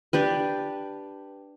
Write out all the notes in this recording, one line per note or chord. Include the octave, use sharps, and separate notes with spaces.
D4 G4 B4